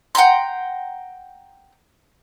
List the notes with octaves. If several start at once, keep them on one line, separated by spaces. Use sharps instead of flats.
F#5 G5 A#5 C6